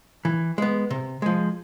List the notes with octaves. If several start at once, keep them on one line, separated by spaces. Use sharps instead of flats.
E3
G#3 B3
C3
F3 G#3